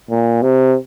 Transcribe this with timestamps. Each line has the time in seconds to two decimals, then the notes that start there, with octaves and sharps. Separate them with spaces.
0.10 A#2
0.42 C3